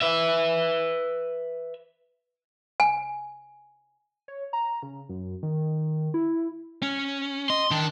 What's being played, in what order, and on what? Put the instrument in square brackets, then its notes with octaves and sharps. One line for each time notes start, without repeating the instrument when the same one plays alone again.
[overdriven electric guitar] B4 E5
[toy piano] G#5
[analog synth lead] C#5
A#5
C#3
F#2
D#3
E4
[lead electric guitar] C#4
[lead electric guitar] D#5 [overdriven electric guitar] C6
[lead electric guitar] D#3 [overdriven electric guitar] D4